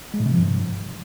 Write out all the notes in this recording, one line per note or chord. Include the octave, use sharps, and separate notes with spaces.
G#3
A2
C3
F3
G2